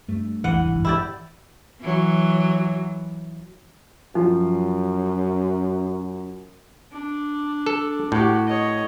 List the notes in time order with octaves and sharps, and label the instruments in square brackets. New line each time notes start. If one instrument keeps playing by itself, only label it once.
[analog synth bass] G2 [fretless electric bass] A3
[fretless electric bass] A1 E2 A2 [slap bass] E3 [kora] F#5
[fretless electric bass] F#1 C2 G#2
[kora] E4 G4 D5
[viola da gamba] E3 F#3
[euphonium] F#2 [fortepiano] F3
[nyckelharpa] D4
[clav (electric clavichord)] A4
[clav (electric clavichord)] A2 [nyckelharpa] F#4 G4
[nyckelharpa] C#5 D#5